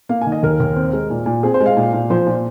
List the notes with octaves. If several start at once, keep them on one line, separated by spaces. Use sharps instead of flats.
A#3 F5
G#5
D#3
D#5
D#2 A#4
D#2
C4
G#3
A#2
A#2
C4 G#4
C5
G#3
F5
A#2
A#2
F3 C5
A#2